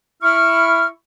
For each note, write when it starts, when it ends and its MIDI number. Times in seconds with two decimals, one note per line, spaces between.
0.22 0.87 64
0.22 0.87 85
0.22 0.87 89